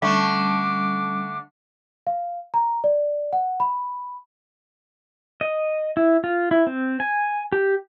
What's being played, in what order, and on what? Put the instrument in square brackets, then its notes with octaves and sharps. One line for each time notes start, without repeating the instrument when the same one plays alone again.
[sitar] D3 A3 [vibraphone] G3 C#4 [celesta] B5 C#6 [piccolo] D6
[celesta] F5
A#5
D5
F#5
B5
[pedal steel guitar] D#5
E4
F4
E4
C4
G#5
G4